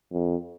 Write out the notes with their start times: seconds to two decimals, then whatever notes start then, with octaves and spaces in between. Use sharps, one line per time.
0.12 F2